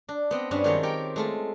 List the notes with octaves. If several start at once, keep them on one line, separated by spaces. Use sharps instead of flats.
D4
B3 C4 D#5
G2 B3 C#4 D4
D#3 F#3 G#3 C4 F4 C#5
G4 A#4 G5
G#3 A3 F4